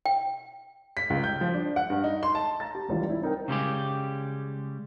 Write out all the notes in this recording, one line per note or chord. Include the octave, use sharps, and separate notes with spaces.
G5
B6
C#2
G6
F3
D4
F#5
G2
D#4
C6
A5
A#5 A6
G4
G#1 C#2 E3 G3 F4
E4
C4 D#4 A#4 G5
C#3 G3 G#3 G4